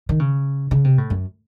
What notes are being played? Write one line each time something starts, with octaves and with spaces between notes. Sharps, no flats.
D#3
C#3
C#3
C3
A2
F#2